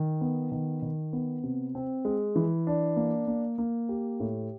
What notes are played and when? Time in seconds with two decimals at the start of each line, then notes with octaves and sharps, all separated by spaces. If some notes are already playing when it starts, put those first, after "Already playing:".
Already playing: D#3
0.21 B3
0.52 D#3
0.82 D#3
1.13 B3
1.43 C3
1.75 C4
2.05 G#3
2.36 E3
2.67 D4
2.96 A#3
3.27 A#3
3.58 A#3
3.89 G4
4.20 A2